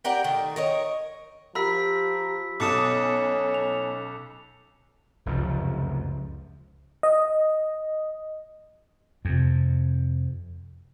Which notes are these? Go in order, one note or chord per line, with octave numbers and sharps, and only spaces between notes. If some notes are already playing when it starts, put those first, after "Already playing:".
G4 A#4 D5 F#5
D#3 A3
A#4 C#5 D#5
F3 G4 A#4 B5 E6 B6
B1 B3 C#4 A4 D6 D#6 C#7 E7
F7
F1 C#2 F#2 F3
D#5
F2 C3